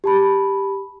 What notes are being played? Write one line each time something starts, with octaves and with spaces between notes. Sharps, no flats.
G4 A5 B5